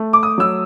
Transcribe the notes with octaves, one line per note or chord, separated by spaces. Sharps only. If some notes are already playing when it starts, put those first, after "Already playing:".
Already playing: A3
D6
D#6
F#3 E6